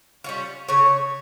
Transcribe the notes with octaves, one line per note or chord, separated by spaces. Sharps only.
G3 C#4 F4
C#3 C#5